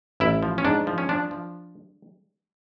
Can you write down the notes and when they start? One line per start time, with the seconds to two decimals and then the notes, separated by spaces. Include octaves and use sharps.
0.20 A1 E4
0.43 F3
0.58 C#4
0.65 G#2 D4
0.87 F3
0.98 C#4
1.09 F3 D4
1.31 F3